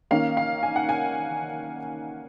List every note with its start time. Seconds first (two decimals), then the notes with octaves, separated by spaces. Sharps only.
0.11 D#3 A#3 C#4 F5
0.37 F5
0.63 G#5
0.76 F#5
0.89 G#5